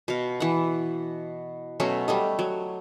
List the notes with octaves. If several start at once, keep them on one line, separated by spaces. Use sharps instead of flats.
B2 F5
E3 F#5
B2 F#3 A3 C#4
G3 A3 D#5
F#3